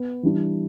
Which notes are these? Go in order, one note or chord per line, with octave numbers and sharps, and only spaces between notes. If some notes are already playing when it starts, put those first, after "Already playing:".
Already playing: B3
E3 G3 D4